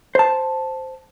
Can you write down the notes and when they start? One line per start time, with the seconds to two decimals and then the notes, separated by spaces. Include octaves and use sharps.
0.15 C5 A5